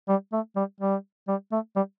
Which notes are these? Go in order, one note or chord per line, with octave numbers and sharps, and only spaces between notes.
G3
A3
G3
G3
G3
A3
G3